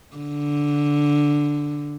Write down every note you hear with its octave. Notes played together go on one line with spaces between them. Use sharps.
D3